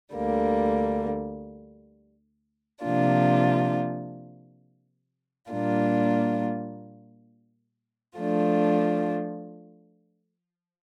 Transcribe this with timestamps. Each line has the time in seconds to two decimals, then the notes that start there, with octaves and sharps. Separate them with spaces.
0.13 D2 D3 G3 A#3
2.82 C3 F3 A#3 D4 F4
5.50 A#2 G3 A#3 D4 F4
8.18 F3 A3 D4 F4